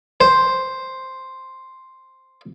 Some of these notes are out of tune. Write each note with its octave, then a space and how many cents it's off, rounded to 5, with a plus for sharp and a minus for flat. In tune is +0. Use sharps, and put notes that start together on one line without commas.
C5 +0